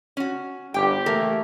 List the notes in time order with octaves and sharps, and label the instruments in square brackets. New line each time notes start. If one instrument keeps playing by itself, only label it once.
[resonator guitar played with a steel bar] C#4 F#4
[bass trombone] G1 [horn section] G4 [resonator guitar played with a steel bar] G5
[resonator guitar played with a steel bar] E3 A#3 A#4 [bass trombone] A3